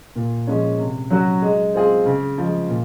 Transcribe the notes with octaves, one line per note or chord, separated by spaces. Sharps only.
A#2
F3 G#3 C#4
C3
F#3 C#4 F#4
G#3
C4 F4 G#4
C#3
F3 G#3
A#2